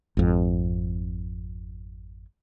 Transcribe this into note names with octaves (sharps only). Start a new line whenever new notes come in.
G#1 F2